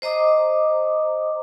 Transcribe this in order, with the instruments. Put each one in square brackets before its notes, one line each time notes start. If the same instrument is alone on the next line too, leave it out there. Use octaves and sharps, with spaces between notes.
[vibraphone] C5 D#5 A#5 D6 D#6